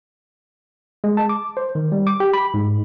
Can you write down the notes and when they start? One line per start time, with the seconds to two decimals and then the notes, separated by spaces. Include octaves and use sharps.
1.04 G#3
1.17 A5
1.29 D6
1.57 C5
1.75 D#3
1.92 G3
2.07 D6
2.20 G4
2.33 B5
2.54 G#2